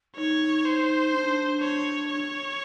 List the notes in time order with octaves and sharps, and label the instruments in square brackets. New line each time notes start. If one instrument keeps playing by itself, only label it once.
[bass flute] D#4 [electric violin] C#5
[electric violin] C5
[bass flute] D4
[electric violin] C#5
C#5